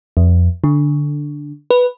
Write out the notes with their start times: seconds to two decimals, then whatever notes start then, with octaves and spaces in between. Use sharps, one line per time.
0.17 F2
0.64 D3
1.70 B4